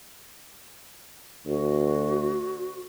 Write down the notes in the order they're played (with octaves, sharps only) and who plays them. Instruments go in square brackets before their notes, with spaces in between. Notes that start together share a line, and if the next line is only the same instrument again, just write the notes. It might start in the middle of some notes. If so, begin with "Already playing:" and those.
[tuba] D2 [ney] F#4